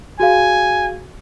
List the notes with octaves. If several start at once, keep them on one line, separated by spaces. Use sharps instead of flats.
F#4 G#4 F5 G#5